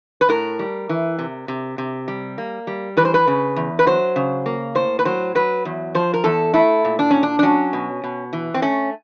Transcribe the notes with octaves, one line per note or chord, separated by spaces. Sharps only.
B4
A2 A#4
G3
E3
C3
C3
C3
G3
A#3
G3
E3 B4
C5
B4
C#3
E2
B4
F#3 C5
C#3
A#3
A2 C5
B4
F#3 C5
F#3 B4
E2
F3 C5
A#4
E2 A4
A3 E4
A#2
D4
A#2 C#4
D4
D4
F#3 C#4
B2
B2
E3
C4
A3 C#4